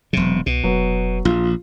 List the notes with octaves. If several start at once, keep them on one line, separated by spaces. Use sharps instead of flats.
E1 C3 F#3
C2 B2
F1 F#3 B3
A#1 F4